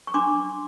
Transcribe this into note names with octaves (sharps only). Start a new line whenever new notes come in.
C#6
D4 C6 D6